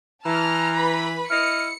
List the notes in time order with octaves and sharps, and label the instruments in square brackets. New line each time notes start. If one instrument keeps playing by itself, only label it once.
[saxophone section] E3 [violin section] A5 F6 [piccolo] A#5
[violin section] B4 B5
[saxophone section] E4 D#5 [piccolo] F6 [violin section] C#7